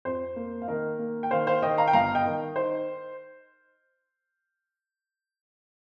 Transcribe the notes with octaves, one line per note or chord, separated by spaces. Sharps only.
F2 C5
A#3
F5
D#3 A#4 D#5
A#3
G5
D#3 C5 F5
C5 F5
D#3 D#5 G5
F5 A#5
G5
G1 F5 A#5
D#5 G5
D#3
D#4 C5